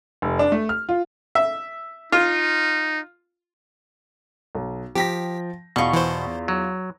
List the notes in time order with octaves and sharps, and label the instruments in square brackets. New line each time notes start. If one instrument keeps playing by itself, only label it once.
[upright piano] F1
D4
A3
F6
F4
[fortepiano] E5
[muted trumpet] D#4 [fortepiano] F4
[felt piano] B1
[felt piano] F3 G5 A#6 [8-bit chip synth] G4 B6
[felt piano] E2 [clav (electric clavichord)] B2 [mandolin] F4 C#6
[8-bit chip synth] E3 C5
[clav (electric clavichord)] F#3